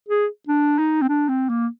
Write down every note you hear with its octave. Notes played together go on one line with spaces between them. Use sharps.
G#4
D4
D#4
C4
D4
C4
A#3